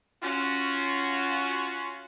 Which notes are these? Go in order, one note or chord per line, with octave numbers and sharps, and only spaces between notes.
C#4 F4 F#4